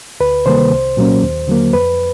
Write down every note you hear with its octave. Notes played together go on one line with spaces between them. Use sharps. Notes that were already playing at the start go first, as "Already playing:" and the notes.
D2 B4
C3 D#3 G3 A#3 C5
C2
A#2 F#3 A#3 C#4
D#2
D3 F#3 A#3
F2 B4